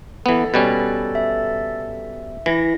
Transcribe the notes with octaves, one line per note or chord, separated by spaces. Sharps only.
E3 B3 A4
B2 G3 C#4 B5
E5
E3 E4 A#6